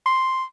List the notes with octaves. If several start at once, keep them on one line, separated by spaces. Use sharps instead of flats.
C6